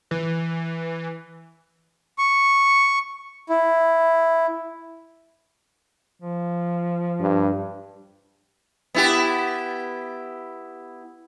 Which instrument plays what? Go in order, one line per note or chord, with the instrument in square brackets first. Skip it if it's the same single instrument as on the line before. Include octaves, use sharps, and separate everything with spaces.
[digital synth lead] E3
[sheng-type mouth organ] C#6
E4
[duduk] F3
[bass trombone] G2
[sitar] B3 E4 G4